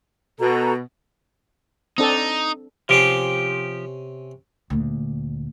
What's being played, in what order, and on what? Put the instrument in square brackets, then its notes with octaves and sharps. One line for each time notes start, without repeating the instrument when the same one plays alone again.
[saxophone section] B2 [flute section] F#4 A4 A#5
[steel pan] C4 D4 A4 [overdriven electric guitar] D#4
[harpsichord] C3 C#4 [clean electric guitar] F3 G4
[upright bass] D2 A#2